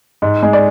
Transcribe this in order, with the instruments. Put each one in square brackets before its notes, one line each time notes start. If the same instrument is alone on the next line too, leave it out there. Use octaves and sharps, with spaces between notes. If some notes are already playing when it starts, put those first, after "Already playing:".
[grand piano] G#2
G#3
D5